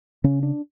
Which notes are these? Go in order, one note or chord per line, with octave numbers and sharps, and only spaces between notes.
C#3 C#4
D4